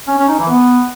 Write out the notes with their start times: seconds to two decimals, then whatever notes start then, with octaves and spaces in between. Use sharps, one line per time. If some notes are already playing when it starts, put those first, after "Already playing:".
0.07 C#4
0.18 C#4
0.28 D#4
0.39 E3
0.49 B3